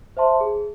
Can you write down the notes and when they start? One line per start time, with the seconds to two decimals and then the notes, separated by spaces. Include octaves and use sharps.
0.17 C5 E5 A5 C6
0.41 G#4